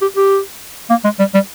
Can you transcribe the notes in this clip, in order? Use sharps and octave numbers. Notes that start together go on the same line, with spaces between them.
G4
G4
A#3
G#3
G3
G3